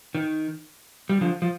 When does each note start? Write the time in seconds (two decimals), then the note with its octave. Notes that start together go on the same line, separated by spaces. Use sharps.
0.15 D#3
1.09 G3
1.21 D3 F3
1.42 F3